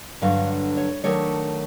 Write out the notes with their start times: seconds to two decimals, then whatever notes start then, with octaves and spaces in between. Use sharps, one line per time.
0.21 G2 D3 F#3 F5
0.77 C#5
1.04 D#3 F#3 A3 D4 C#5